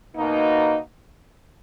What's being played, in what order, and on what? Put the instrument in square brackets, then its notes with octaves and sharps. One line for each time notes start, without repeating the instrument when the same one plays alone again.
[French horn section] B2 A#3 D#4